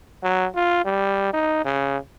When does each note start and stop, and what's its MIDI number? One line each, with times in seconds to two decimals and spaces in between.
0.23 0.47 54
0.55 0.83 65
0.85 1.30 55
1.33 1.61 63
1.65 1.97 49